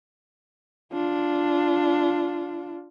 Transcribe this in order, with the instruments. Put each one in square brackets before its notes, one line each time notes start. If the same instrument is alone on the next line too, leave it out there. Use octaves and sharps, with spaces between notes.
[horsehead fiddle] D4 F4